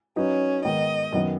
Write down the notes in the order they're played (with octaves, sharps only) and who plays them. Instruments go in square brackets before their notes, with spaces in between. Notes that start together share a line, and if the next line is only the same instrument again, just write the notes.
[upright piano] F#3 D#4 B4 [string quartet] C#4
[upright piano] G#2 D#3 B3 [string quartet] D#5
[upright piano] F#2 D#3 B3 D#4